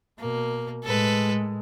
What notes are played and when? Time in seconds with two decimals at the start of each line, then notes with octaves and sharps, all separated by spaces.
0.19 B2 A#3
0.84 A2 G#3 A4 B4